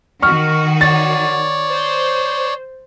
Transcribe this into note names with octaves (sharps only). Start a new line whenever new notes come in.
D#3 F#4 C#6 F6
C#5 D5 A6
C5